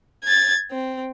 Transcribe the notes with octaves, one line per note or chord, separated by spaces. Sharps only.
G#6 A6
C4